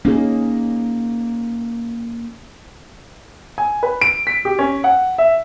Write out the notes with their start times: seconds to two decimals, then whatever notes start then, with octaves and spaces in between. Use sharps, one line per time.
0.05 A#3 C#4 D#4 G#4
3.58 G#5
3.83 B4
4.02 D7
4.27 B6
4.45 G4
4.59 C#4
4.84 F#5
5.18 E5